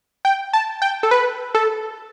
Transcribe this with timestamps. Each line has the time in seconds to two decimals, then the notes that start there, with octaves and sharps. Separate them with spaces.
0.25 G5
0.53 A5
0.82 G5
1.03 A4
1.11 B4
1.55 A4